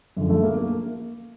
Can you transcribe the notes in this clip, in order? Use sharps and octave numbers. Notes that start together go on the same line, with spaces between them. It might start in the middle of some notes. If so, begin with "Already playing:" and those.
F#2 D3 F3
A3
A#3
A#3